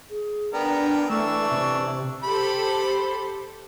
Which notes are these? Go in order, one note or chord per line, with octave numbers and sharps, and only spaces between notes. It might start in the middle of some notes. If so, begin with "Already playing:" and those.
G#4
B3 D4 A#4 G5
E3 A3 D4 C#6 E6
C3
G4 A4 C5 B5